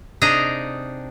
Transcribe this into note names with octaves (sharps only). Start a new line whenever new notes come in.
C3 D4 D#4 G#4 D#5 A#5